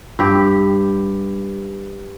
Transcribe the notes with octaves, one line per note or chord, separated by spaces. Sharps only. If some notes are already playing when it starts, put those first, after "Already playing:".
G2 G4